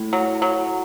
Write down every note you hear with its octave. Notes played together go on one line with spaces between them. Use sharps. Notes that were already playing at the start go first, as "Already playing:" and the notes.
Already playing: A2
F#3
F#3